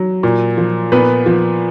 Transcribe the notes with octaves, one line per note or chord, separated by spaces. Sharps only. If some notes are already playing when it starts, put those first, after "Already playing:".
Already playing: F#3
A#2
F3
A#2 B3 B4
F3